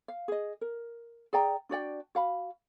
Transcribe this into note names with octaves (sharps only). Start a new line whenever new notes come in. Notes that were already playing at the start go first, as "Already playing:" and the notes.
F5
G#4 D#5
A#4
G#4 D5 G5 A#5
D4 F#4 D5 G5
F#4 F5 B5